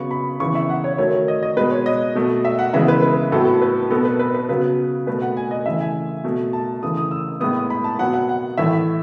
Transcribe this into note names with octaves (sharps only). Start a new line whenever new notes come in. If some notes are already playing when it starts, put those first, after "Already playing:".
Already playing: C#3 F#3 B3 C#6
B5
C#3 E3 B3 C#6
E5
F#5
C#5
D#3 F#3 A3 C#5
D#5
D#5
B2 G#3 B3 B4
C#5
D#5
B2 F#3 A3
E5
F#5
C#3 E3 G#3 B3 E5
B4
B4
A2 F#3 B3 A4
B4
B2 F#3 B3 A4
B4
B4
B4
C#3 F#3 B3 B4
B2 A3 B4
F#5
G#5
D#5
C#3 E3 A3 E5
G#5
B2 A3
A5
C#3 E3 A3 D#6
D#6
E6
A2 G#3 B3 D#6
B5
A5
B2 F#3 B3 F#5
F#5
F#5
A2 E3 A3 E5